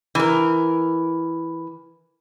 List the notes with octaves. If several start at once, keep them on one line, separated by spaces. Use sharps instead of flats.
E3 A#4